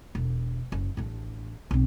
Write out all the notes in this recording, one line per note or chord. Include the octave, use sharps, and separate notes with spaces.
E1
F#1
A1 D4
B1 C4